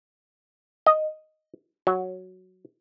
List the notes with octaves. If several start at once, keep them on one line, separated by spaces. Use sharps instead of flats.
D#5
F#3